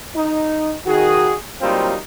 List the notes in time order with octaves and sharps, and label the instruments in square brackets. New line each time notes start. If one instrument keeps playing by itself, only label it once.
[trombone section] D#4
D#3 F#4 G#4
F#3 G3 A#3 C4 D#4 F4